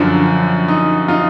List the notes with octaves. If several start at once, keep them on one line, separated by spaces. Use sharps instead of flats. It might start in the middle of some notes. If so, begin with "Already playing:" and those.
Already playing: F#2 D3 F3 D4
D#4
D#4 F4